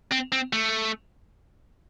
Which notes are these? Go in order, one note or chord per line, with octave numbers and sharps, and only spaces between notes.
C4
C4
A3